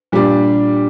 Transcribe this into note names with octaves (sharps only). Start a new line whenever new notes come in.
A#2 G3 D4 G4